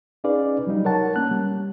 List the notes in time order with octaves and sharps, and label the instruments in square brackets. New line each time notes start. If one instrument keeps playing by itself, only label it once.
[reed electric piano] C#4 D#4 G#4 B4 D5 F5
F#3 G3 D#4
A#4 C#5 F#5 A5
A#3 C#4 F#6
G3